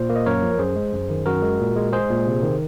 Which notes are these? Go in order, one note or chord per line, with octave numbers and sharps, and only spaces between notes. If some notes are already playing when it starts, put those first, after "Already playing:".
Already playing: A#2 C5
A#3
D#5
F#2 A#4 C#5
F3
F#2 G#4 C5
G#3
F#2
D#3
F#2 F#4 A#4
G#3
A#2
G#3
G#3 G#4 C5
A#2
C3
D#3